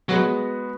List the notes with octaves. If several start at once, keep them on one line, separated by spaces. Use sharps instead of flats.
F#3 G#3 B3 F#4